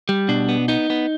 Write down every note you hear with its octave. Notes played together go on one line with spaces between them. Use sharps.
G3
B2 D4
B3
B3 D#4
B3